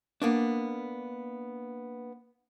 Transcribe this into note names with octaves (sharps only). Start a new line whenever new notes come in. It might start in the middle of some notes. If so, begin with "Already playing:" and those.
A#3 B3 D4